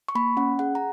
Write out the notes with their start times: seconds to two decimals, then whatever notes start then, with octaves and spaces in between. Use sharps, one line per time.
0.08 C#6
0.15 A#3 B5
0.37 C#4 F#5
0.59 G#4 F#5
0.75 A#5